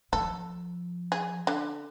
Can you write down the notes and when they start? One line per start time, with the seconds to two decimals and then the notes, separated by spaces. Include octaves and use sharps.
0.13 F3 A4
1.12 G#4
1.47 D3